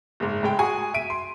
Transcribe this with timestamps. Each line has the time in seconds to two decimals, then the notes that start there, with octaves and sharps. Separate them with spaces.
0.20 F#1 G#2
0.43 A2 G#3 G5
0.59 F#4 G#4 G#5 C#6
0.94 E5 D7 D#7
1.10 C6